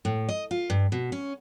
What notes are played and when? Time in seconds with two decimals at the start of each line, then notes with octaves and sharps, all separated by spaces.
0.05 A2
0.29 D#5
0.51 F4
0.70 G2
0.92 B2
1.12 C#4